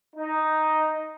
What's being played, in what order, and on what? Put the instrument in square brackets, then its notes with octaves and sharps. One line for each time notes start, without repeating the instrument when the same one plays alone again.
[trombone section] D#4